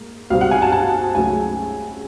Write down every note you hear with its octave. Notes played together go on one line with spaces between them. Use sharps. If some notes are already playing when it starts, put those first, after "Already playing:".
Already playing: G#2 A#3
C#2 B2 G3 C4 F5
F#5
G#5
A5
A5
C#2 C#3 F#3 A3 G#5